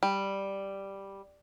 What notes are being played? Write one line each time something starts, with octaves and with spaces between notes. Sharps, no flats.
G3